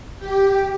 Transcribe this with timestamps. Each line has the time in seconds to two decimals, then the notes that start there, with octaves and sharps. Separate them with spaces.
0.19 G4